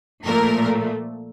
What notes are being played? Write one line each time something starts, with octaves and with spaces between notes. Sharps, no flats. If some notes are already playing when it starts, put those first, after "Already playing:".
A#2 F3 A3 A#4